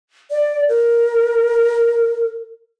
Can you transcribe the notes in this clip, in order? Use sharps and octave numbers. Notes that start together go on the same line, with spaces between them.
D5
A#4